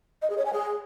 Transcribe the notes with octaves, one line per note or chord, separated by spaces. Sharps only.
D#5
G#4
C#5
G#5
G#4